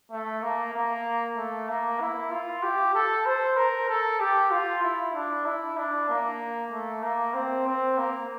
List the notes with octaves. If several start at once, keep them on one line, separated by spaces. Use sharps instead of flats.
A3
A#3
A#3
A3
A#3
E4
F4
G4
A4
C5
A#4
A4
G4
F4
E4
D4
E4
D4
A#3
A3
A#3
C4
C4
A#3